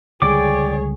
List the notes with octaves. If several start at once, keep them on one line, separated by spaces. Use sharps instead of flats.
C#2 D3 G3 G#4 C#5 D5 G5 D6